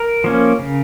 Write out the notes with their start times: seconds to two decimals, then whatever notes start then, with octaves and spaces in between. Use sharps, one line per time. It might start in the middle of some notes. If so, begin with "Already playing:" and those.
Already playing: A#4
0.24 F3 A#3 C#4
0.59 C#3